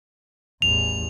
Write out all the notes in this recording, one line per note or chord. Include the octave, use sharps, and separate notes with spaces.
A1 E2 F7